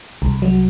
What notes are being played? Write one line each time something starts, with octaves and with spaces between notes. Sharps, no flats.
C2
F#3